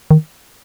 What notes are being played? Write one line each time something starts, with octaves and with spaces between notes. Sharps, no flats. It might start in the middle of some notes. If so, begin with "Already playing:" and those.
D#3